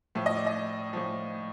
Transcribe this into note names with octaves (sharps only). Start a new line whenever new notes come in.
A2 F3 E5
D#5
D5
D#5
A2 F3